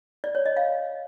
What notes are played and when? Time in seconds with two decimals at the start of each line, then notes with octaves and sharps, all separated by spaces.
0.24 D5
0.35 C#5
0.46 D#5
0.56 F5